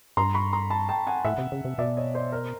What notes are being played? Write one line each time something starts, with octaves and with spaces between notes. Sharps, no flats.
G2 A#5 C6
B5 C#6
A#5 C6
A5 B5
G5 A5
F#5 G#5
A2 E5 F#5
C3
C#3
C3
B2 D5 E5
C#5 D#5
C5 D5
A#4 C5